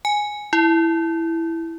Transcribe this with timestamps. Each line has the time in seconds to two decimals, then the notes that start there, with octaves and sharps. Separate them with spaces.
0.05 G#5
0.53 E4